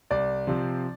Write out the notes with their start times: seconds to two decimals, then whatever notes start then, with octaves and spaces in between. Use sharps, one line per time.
0.11 C2 D5
0.47 C3 F3 C4